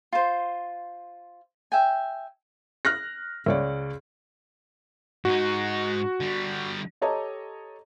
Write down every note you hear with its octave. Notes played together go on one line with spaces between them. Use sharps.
F4 C5
E5 G5 G#5
F6 F#6 A#6
C#2 C#5 D5
G#2 D#4 F#4
D3 G3
G4 A4 C#5 D#5 A5 A#5